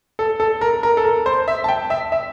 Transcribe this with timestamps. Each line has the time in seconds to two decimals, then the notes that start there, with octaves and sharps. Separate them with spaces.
0.19 A4
0.40 A4
0.61 A#4
0.83 A#4
0.97 A4
1.05 A#4
1.26 C5
1.48 E5
1.64 A5
1.69 G5
1.90 E5
2.12 E5